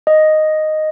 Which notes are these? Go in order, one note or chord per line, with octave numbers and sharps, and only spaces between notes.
D#5